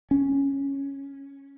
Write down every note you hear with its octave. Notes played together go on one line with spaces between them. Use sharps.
C#4